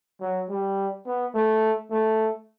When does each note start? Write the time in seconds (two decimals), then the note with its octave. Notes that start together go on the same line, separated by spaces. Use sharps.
0.21 F#3
0.49 G3
1.06 B3
1.34 A3
1.91 A3